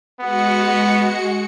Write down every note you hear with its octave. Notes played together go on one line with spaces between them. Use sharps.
G#3 B3 F#4 C#7